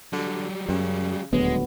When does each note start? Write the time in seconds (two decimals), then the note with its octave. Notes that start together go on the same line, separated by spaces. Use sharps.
0.13 D3 F#3 G3
0.69 F#2 C#3
1.33 D#1 D2 F#3 G#3 B3